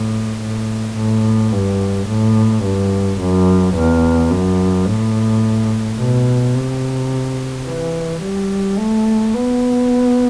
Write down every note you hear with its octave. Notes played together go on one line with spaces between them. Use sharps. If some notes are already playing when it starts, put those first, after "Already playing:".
Already playing: A2
A2
A2
G2
A2
G2
F#2
E2
F#2
A2
B2
C3
E3
G3
A3
B3